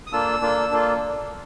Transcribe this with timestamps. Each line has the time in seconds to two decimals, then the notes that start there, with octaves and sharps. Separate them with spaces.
0.07 D#6
0.12 A#3 D4 F4 A4 E6
0.41 A#3 D4 F4 A4
0.71 A#3 D4 F4 A4